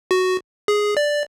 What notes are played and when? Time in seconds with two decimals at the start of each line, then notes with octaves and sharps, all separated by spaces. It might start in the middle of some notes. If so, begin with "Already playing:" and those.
0.11 F#4
0.68 G#4
0.97 D5